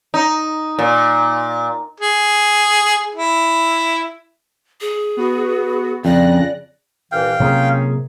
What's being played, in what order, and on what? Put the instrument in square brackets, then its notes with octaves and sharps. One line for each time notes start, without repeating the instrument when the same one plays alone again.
[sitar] D#4
A#2
[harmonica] G#4
E4
[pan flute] G#4
[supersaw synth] B3 F#4
[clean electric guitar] F2 [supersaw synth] C#3 F#6 A#6 [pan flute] D5
[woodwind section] C2 A#2 E3 [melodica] F5 G5
[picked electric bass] C3 F#3 A#3 [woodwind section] C#4 F4 G#4